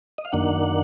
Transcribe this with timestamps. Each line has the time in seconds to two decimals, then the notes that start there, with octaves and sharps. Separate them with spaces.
0.18 D#5
0.25 F5
0.32 F#2 D#3 A#3 D4 F#5